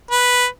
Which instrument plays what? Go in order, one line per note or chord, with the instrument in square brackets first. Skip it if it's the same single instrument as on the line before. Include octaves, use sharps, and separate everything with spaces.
[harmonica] B4